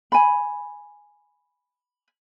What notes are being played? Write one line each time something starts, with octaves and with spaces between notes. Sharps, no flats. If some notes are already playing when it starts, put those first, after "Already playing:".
G#5 B5